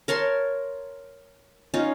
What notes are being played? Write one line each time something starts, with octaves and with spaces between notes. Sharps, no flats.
A#4 C#5 A5 C6
C#4 D#4 F4